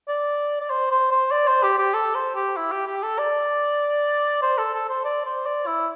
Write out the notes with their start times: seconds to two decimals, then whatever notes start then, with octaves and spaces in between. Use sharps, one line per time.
0.08 D5
0.61 D5
0.70 C5
0.91 C5
1.11 C5
1.32 D5
1.48 C5
1.63 G4
1.78 G4
1.94 A4
2.15 C5
2.36 G4
2.57 E4
2.72 G4
2.87 G4
3.03 A4
3.18 D5
4.42 C5
4.58 A4
4.74 A4
4.89 C5
5.05 D5
5.26 C5
5.46 D5
5.66 E4